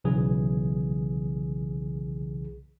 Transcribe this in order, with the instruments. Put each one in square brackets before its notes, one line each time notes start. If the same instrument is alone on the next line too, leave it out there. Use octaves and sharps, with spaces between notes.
[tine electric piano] B1 C#3 E3 G#4